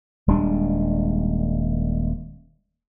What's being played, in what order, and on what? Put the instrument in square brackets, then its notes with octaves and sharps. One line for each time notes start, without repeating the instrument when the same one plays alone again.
[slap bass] D#1 G3 G#3 D4